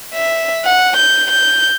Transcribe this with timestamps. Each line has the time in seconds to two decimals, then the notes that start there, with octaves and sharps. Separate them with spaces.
0.13 E5
0.64 F#5
0.96 G6
1.31 G6